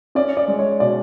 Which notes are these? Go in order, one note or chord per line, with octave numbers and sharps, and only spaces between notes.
C#4 D5
D5
G#3
C#5
B2 D5